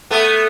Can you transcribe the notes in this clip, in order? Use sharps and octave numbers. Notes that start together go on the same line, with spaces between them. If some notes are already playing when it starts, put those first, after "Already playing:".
A3 B3